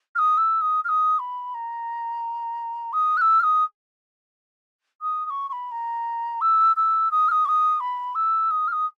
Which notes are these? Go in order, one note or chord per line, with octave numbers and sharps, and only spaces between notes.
F6
D#6
E6
D#6
F6
D#6
B5
A#5
D#6
F#6
E6
F6
D#6
D#6
D#6
C#6
C#6
B5
A#5
E6
E6
D#6
F6
D#6
C#6
D#6
B5
E6
D#6
F6
D#6